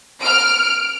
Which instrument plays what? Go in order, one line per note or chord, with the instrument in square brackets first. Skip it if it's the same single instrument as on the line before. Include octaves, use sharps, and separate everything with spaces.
[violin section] F6 D7